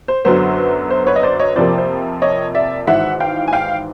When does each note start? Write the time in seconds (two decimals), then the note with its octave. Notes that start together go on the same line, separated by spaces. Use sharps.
0.08 C5
0.25 F#2 D3 F#3 B3 C5
0.91 C5
1.07 B4 C#5
1.16 D#5
1.23 C5 D5
1.40 C#5 D#5
1.56 F2 C3 F3 A#3 C5 D5
1.78 C5
2.22 C#5 D#5
2.54 D5 E5
2.87 G#1 G#2 E3 E5 F#5
3.20 F5 G5
3.48 G#5
3.53 F5 G5